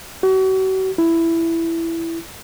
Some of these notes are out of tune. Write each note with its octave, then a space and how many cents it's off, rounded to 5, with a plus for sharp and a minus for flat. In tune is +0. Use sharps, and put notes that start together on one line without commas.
F#4 +40
E4 +10